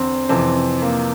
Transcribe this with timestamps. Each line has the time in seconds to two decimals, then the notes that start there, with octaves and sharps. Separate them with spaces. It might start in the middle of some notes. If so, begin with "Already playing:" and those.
Already playing: E2 D3 C4
0.29 F2 C3 E3 C4
0.82 A#3